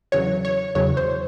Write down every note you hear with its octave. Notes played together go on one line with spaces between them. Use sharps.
E2 C#3 F#3 C#5
C#5
E2 C#3 F#3 C#5
C5